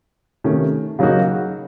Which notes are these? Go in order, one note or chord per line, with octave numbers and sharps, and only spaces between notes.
C3 D#3 A3 C#4
C#3 F#3 A#3 D#4 F#4